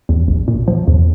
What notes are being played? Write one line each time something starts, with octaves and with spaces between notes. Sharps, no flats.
E2
A#1
A#2
F3
E2